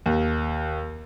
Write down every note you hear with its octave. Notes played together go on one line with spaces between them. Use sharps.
D#2